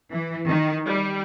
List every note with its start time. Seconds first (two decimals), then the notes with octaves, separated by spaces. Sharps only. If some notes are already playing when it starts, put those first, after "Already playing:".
0.11 E3
0.48 D#3
0.87 G3